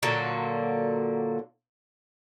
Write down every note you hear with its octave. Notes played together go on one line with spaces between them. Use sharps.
A#2 D3 F#3 A#3